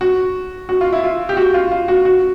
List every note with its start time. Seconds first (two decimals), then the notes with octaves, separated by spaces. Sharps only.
0.01 F#4
0.69 F#4
0.81 F4
0.93 E4
1.04 F4
1.29 G4
1.37 F#4
1.54 F4
1.72 F4
1.88 F#4
2.05 F#4